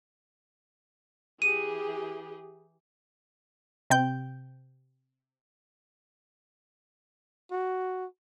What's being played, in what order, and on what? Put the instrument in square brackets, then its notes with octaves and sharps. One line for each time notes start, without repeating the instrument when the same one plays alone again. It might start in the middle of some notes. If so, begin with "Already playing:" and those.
[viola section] E3 G4 G#4 [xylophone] D#7
[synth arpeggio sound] C3 C4 G5 G6
[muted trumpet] F#4